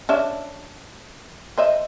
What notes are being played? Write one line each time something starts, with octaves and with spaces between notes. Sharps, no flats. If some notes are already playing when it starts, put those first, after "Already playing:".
C#4 D4 E5
C5 D#5 E5